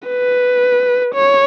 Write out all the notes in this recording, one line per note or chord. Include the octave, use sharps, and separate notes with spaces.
B4
C#5